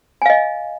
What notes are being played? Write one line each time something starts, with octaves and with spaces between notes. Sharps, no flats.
D#5 F5 G#5